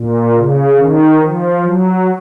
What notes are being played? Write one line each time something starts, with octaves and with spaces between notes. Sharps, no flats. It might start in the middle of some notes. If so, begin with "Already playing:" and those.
Already playing: A#2
C#3
D#3
F3
F#3